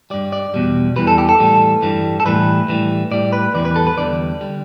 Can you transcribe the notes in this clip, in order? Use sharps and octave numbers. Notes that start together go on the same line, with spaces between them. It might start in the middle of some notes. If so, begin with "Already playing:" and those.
G2 G3 D5
D5
E2 B2 G3
E2 E3 G3 B4
A4
G4
A4
A2 E3 G3
G2 E3 G3
A4
A2 E3 G3 B4
A2 E3 G3
A2 G3 D5
B4
E2 E3 G3 D5
B4
A4
B4
E2 D3 G3 D5
D3 G3